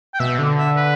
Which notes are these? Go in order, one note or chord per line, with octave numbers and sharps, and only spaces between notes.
G5
B2 E5
D3
E5
B4